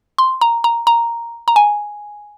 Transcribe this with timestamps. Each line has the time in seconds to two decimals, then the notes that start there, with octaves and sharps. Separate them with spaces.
0.18 C6
0.41 A#5
0.64 A#5
0.87 A#5
1.48 A#5
1.56 G#5